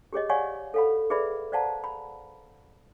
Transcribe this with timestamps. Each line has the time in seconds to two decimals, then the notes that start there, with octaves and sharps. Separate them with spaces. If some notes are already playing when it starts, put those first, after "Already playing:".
0.13 G4 G#4 C#5 D#5
0.29 C#5 D5 F5 F#5 G#5 C#6
0.74 A4 C#5 F5 F#5 B5
1.10 G#4 B4 D5 E5 B5
1.52 C5 D5 F5 F#5 A5 A#5
1.84 B5